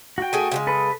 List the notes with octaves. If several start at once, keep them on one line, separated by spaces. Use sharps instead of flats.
F#4 G5
A3 G#4 G#5
C#3 F#3 G#3
A4 B4